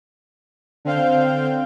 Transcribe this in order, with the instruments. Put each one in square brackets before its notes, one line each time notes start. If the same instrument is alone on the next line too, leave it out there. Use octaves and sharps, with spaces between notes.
[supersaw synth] D3 C4 F5 G6